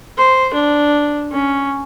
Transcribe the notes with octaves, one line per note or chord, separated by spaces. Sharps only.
C5
D4
C#4